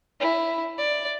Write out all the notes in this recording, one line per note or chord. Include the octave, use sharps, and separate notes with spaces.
E4
D5